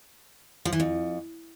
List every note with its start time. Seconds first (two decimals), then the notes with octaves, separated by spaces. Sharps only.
0.65 F3
0.73 E3
0.80 F2